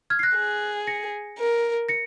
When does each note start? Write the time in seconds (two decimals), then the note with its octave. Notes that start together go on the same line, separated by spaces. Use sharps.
0.10 F6 G#6
0.19 C7
0.23 F#6 A#6
0.36 G#4
0.87 A#6 C#7
1.38 A#4
1.89 A#6 C#7